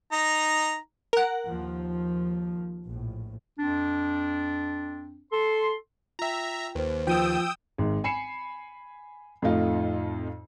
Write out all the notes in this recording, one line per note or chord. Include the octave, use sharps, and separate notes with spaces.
D#4 A#5
A#4 F#5
D#2 F3
A#1 A2
F2 C4 D4
A4 C6
F4 E5 G5 A#5
D#2 B4 C5
F3 G5 D#6 E6
G#1 G#2
G#5 B5 C7 C#7 E7
F2 A2 A3 D#4 F4